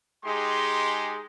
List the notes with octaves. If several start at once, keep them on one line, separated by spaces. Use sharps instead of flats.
G#3 D#4 G4 G#4 C6